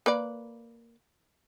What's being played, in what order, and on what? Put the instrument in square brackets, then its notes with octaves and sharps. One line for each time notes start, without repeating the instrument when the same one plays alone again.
[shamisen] A#3 B4 D5